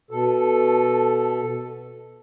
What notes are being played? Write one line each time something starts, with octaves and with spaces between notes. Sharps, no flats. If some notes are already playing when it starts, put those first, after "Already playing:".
B2 A4